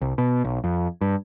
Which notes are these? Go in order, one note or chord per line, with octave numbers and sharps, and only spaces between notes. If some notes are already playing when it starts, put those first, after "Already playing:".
C2
B2
B1
F2
G2